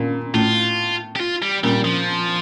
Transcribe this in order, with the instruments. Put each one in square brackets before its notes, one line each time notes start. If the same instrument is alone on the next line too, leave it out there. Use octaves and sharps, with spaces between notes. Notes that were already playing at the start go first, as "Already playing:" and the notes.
Already playing: [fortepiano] A#2
[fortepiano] A2 [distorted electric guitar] F4
[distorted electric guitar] G4
F4
G3
[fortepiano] A#2 [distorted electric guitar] G3
[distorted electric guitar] F3